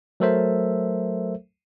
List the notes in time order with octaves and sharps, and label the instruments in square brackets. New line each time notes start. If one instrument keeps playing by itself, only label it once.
[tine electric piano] F#3 A3 A4 A#4 C5 E5